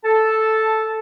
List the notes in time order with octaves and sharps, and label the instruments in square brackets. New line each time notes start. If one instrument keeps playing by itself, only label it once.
[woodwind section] A4 A5